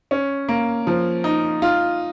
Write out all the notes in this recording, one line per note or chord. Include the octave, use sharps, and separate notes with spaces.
C#4
A#3
F3
D#4
F4